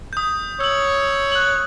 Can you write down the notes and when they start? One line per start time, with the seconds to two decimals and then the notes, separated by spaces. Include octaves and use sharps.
0.13 D#6 G6
0.61 C#5 E6 F#7
1.32 F#6 F#7